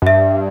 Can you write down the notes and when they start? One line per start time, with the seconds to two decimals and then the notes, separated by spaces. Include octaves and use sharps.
0.02 F#2
0.06 G2 E5